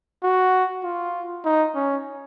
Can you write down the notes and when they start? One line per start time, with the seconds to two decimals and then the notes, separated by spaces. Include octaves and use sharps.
0.23 F#4
0.84 F4
1.45 D#4
1.75 C#4